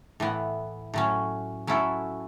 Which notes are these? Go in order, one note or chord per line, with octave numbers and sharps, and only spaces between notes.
A2 E3 B3
A2 F#3 C#4
F#3 C#4 E4 A4